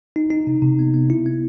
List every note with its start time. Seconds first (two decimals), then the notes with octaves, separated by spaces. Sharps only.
0.16 D#4
0.31 D#4
0.47 C3
0.62 C3
0.79 B3
0.94 B3
1.10 E4
1.26 B3